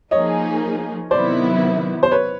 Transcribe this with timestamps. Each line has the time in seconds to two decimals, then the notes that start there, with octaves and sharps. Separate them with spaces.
0.11 F3 A#3 D#4 G#4 C#5 D#5
1.11 C3 D#3 F#3 B3 E4 C5 D5
2.03 C5
2.11 B4 C#5